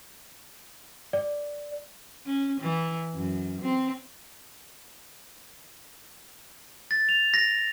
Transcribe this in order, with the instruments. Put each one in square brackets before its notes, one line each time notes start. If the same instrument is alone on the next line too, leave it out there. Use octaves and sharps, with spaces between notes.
[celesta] D5
[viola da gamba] C#4
E3
F#2
C4
[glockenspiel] A6
F7
A#6